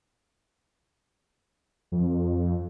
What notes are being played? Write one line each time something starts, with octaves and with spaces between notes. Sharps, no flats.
F2